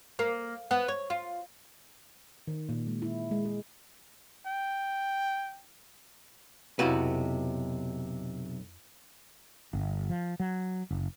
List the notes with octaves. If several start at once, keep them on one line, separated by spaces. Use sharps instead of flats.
A#3
B3
C#5
F4
D#3
A#2
G#3
E4
G#3
G#4
G5
B1 F2 C3 E4 F#4 B4 F5
G1
F3
F#3
F#1